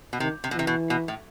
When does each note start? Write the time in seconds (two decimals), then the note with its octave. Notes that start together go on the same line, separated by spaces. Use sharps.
0.13 B2
0.20 C3 D#3
0.44 C3
0.51 B2
0.55 C3 E3
0.67 B2
0.90 B2
1.08 A2